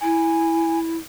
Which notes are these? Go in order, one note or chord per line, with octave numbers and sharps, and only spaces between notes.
E4 G#5